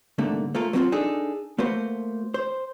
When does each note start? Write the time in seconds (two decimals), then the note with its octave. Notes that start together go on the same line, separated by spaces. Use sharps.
0.18 C2 G#2 D3 A3 A#3
0.55 A3 A#3 F4 A4 A#4
0.73 F#3 B3 C4 D#4 F4 F#4
0.92 D4 D#4 G#4 A4
1.58 A3 A#3 F#4 B4 C5
2.34 C5